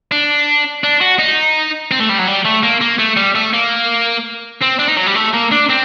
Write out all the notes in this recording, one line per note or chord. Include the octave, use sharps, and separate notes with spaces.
D4
D4
F#4
D#4
C4
A3
G3
F#3
G3
A3
A#3
A#3
A3
G3
A3
A#3
C4
D4
D#4
F#3
G3
A3
A#3
D4
C4